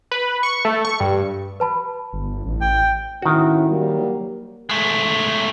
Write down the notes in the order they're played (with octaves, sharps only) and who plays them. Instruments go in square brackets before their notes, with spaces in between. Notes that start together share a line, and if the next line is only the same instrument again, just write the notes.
[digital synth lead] B4
C#6
A3
C#6
G2
[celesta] B4 A5 B5
[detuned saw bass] G1
A1
[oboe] G5
[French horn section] A2 C#4 E4 [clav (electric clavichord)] D#3 F#4
[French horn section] F#3 G3 A#3
[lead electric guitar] G#3 A3